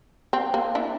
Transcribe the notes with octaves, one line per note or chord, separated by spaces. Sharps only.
C4
A#3
D4 E4